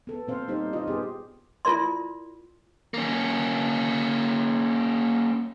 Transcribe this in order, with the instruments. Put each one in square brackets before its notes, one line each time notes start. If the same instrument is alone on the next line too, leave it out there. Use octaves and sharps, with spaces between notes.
[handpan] B3 A4
A#2 C4 C5 F5
G3 D#4 G4 C5
F4 D#5
B3 G4 G#4
[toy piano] E4 F4 A#4 D5 C6
[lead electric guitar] A#3 C#4